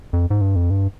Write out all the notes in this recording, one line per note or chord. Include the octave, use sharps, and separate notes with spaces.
F2
G#2
G2
F2
G2